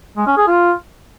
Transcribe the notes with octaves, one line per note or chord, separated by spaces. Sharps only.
G#3
C#4
G#4
F4